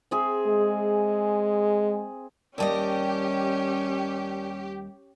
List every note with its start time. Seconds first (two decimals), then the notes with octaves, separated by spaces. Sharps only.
0.11 C4 G#4 E5
0.47 G#3
2.58 D#2 G3 C#4 G4 A#4 D5 D#5 A5